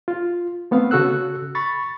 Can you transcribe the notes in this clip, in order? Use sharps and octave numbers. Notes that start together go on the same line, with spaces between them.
F4
A3 B3 C4 F5
C#3 F#4 A4 E6 F#6
B5 C#6 A6